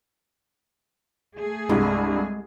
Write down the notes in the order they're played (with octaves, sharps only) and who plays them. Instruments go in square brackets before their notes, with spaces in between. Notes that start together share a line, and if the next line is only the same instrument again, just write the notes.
[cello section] A3 G#4
[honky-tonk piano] C2 G2 [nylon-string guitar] G#3